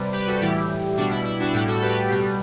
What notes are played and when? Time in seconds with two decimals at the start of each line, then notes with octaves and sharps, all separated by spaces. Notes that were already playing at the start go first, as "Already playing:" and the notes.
Already playing: C3 G3 B4 D5
0.13 G4 B4
0.27 F#4 A4
0.41 A2 E3 G3 E4 G4
0.97 B2 G3 D4 F#4
1.11 E4
1.26 E4
1.40 D4 F#4
1.53 A2 G3 E4 G4
1.68 F#4 A4
1.82 G4 B4
2.10 B2 G3